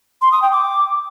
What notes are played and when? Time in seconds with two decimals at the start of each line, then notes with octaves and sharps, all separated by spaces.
0.21 C6
0.32 D#6
0.42 G5
0.52 D6